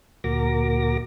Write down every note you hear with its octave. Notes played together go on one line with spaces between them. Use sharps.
D2 A#2 F#4 A#4 D6 A#6